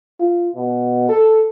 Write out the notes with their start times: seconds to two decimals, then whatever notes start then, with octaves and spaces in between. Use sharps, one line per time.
0.20 F4
0.55 B2
1.09 A4